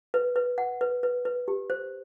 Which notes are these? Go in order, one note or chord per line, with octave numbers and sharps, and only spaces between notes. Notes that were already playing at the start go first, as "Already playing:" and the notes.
B4
B4
F#5
B4
B4
B4
G4
C5